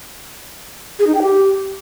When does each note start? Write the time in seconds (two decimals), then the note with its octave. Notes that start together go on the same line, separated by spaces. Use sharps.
0.99 G#4
1.07 D#4
1.15 G5
1.22 G4